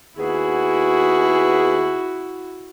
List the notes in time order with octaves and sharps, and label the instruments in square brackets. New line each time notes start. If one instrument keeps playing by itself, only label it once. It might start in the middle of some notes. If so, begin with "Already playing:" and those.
[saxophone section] D#2 B3 G#4 [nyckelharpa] E4 F#4